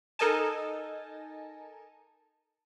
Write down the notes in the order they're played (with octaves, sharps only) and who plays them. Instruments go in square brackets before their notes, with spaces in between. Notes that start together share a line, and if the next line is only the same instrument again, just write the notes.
[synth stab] D#4 A4 A#4 D#5 G#5 A5